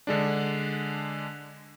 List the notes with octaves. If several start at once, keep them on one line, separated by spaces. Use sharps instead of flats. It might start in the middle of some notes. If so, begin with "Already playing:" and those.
D3 G#3 D4